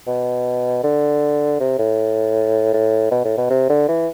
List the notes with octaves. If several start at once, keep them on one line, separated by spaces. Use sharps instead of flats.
B2
D3
C3
A2
A2
B2
A2
B2
C3
D3
E3